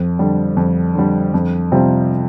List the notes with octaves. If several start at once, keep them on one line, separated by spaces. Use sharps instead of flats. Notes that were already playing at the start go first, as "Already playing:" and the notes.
Already playing: F2
D3 G3
F2
D3 G3
F2
C3 G3 C4 F4